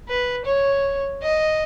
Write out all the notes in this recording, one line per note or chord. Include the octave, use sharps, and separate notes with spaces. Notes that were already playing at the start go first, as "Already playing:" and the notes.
B4
C#5
D#5